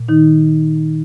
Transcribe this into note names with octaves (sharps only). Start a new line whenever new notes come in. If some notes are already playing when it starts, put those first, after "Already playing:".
Already playing: A#2
D#3 D#4